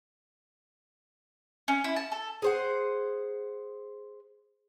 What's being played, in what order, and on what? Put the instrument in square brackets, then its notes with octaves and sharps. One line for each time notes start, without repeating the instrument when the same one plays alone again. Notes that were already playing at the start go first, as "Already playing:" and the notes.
[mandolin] C#4
E4
A5
A4
[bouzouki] G#4 C5 F#5